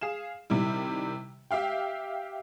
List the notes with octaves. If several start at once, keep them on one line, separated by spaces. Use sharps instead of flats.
G#4 F5 E7
C3 D#3 G3 E4
G4 E5 F5 G5